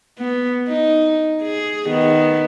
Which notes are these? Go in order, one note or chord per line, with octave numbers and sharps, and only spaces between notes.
B3
D#4
G#4
D#3 B3